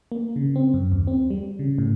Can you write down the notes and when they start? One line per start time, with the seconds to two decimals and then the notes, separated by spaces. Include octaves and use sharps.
0.12 A#3
0.36 C#3
0.56 C4
0.74 F#2
0.92 D#2
1.07 C4
1.30 G3
1.59 C#3
1.78 A2